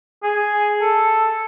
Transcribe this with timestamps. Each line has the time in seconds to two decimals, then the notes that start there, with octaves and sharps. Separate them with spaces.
0.23 G#4
0.81 A4